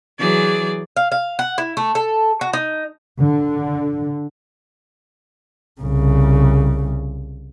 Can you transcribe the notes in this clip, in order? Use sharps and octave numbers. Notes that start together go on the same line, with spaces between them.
E3 F#3 G#4 D5
F5
F5
F#5
E4
A3
A4
F#4
D#4
D3
C2 C#3